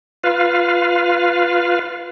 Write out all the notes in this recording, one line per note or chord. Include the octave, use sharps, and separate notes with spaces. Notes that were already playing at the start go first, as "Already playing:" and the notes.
F4 B4 F5